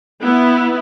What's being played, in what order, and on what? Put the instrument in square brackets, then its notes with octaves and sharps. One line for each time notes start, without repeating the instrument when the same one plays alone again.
[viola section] B3 E4